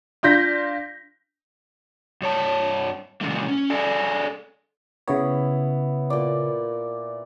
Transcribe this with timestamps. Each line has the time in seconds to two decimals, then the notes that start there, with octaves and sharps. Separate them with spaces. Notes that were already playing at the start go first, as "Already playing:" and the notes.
0.23 D4 F4 G6 A#6 B6
2.22 G2 C#5 A5
3.21 A#2 C#3 E3 G#3 A#3
3.48 C#4
3.70 G#4 A4 D5 G#5
5.08 C#3 B3 E4 C#5
6.10 A#2 D5